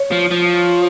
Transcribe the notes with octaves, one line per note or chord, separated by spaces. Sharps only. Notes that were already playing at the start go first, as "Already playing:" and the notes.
Already playing: C#5
F3
F3